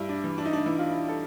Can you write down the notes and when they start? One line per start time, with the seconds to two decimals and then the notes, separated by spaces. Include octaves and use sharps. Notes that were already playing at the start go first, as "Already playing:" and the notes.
Already playing: G2 E4
0.09 D4
0.24 E3
0.38 D4
0.45 D#4
0.53 D4
0.66 E3 E4
0.79 F4
0.90 E4
1.08 A4